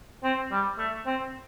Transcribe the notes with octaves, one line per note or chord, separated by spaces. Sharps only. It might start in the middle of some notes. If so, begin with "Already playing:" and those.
C4
G3
A3
C4